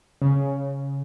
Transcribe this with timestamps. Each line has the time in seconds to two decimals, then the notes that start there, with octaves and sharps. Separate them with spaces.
0.22 C#3